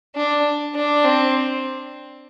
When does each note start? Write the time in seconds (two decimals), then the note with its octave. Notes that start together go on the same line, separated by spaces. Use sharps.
0.15 D4
0.75 D4
1.04 C4